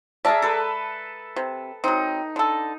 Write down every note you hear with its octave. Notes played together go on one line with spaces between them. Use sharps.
G#4 A#4 D5 E5 A5
A4 B4
C3
F#3 C4 D#4
D3 A4